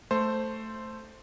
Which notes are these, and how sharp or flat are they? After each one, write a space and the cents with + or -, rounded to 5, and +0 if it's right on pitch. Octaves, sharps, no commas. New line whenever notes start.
A3 +0 C5 +0